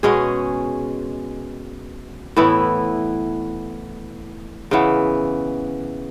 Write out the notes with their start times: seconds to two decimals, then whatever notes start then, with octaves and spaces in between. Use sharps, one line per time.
0.03 B2 G#3 C#4 G#4
2.36 A2 E3 B3 E4
4.71 C#3 E3 B3